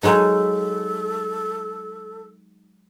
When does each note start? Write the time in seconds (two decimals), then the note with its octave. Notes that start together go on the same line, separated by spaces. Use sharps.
0.03 F#3 G#3 D#4 A4